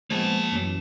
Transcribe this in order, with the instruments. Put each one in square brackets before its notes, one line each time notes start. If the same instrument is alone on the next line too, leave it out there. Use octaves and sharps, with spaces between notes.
[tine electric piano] F3 G#3 B3 [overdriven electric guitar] A#3 A5
[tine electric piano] F#2 E3 F#3